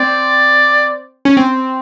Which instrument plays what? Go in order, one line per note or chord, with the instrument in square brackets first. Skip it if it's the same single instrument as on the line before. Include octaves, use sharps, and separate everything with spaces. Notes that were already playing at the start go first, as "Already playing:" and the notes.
Already playing: [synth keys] C4 [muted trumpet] D5
[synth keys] C#4
C4